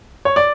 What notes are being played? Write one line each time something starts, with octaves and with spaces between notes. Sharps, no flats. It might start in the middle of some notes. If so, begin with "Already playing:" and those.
C#5
D5